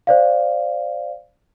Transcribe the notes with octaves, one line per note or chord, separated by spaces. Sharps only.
C5 D5 F5